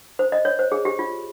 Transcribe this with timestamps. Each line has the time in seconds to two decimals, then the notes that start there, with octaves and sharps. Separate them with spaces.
0.19 C5
0.32 D#5
0.45 C#5
0.59 C5
0.72 G#4
0.85 G4
0.99 F4